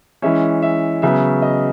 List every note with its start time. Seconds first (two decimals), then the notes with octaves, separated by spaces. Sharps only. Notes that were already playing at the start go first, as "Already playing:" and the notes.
0.22 E3 G#3 C#4 E5
0.62 E5
1.02 C#3 F#3 B3 E5
1.42 D#5